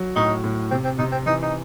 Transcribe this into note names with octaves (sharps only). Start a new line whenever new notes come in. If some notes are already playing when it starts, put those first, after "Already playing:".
Already playing: F#3
A2 D#4
A2
C3 C4
C4
C3 D#4
C4
E3 D#4
D#4